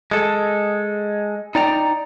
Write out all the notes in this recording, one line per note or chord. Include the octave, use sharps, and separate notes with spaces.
G#3 A4
D#4 D5 G5 A#5